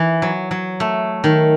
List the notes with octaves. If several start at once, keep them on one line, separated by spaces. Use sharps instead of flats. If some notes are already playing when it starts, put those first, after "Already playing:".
Already playing: E3
F#3
F#3
A3
D#3